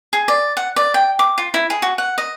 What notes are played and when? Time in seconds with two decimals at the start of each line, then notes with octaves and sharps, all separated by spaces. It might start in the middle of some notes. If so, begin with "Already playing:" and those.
0.13 G#4
0.28 D5
0.57 F#5
0.76 D5
0.94 G5
1.19 D6
1.38 F4
1.54 E4
1.70 G#4
1.82 F#4
1.98 F#5
2.18 D#5